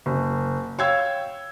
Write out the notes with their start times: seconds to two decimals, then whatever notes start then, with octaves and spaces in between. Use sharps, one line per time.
0.06 F#1
0.79 C#5 F5 G5 E6 G#6